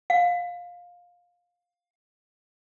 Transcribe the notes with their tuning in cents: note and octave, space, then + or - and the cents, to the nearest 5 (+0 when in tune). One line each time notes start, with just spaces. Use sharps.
F5 +15